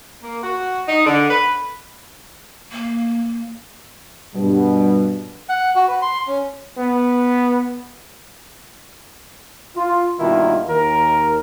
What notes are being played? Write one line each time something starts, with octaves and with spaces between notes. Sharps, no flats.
A#3
F#4
D#4
D3
B4
A#3
G2 B2
F#5
F#4
B4
C6
C#4
B3
F4
G2 B2 D#3 A#3 E4 F4
D#2 A#4